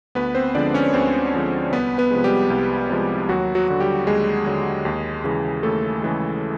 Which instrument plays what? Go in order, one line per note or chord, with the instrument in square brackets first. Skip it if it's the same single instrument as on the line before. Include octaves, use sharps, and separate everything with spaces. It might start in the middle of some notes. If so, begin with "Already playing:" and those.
[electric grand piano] D2 B3 B4
C4 C5
D3 F3 G#3 D4 D5
C#4 C#5
D2 C4 C5
D3 F3 G#3
C2 B3 B4
B3 B4
C3 F3 G#3
G3 G4
C2
C3 F3 G#3
D#2 F#3 F#4
F#3 F#4
D3 F#3
G3 G4
D#2 G#3 G#4
D3 F#3
D#2
C#3 E3 G#3
D#2 A3 A4
C#3 E3 G#3